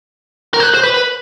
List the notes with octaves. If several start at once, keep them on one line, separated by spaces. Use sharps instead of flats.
A#4
C5
B4
C5
B4
B4